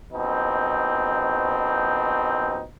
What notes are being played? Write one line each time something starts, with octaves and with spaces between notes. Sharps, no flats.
A#1 B2 C4 D#4